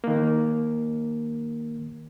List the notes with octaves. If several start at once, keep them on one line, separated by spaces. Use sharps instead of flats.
D#3 A#3